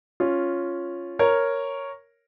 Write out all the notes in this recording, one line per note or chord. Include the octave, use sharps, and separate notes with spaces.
C#4 F4
A#4 C#5